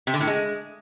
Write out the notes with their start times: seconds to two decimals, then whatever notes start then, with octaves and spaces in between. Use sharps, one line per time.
0.07 C3
0.14 D3
0.20 A2
0.27 G#3